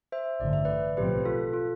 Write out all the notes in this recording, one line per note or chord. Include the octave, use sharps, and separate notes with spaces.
C5 E5
A1 G2 D3 D5
E5
B4 D5
B1 A2 F3 C4 G4 B4
F4 A4
F4 A4